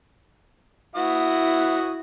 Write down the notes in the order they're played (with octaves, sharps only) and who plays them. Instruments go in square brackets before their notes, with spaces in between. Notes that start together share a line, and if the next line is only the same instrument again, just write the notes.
[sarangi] E4 [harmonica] F#4 F#5 D#6